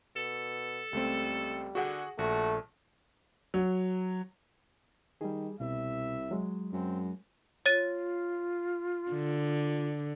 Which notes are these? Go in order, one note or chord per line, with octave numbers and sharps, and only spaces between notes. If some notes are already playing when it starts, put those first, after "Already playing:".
B2 A4
C#2 G3 A3 C4
D3 F#4 G#4 F#5
A#1 A3 F#4
F#3
D#3 G3 G#4
C2 B2 E5
F#3 G#3
F#2 C4
F4 C#5 A6 D#7
D3